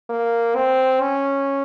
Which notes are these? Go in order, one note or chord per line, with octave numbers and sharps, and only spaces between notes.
A#3
C4
C#4